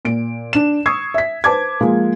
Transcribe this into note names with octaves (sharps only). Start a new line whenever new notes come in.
A#2 D7
D4 E7
C#6 D#6 E6 G#6 C7
E5 B6
B4 C5 A5 D6 G#6
F3 G#3 A#3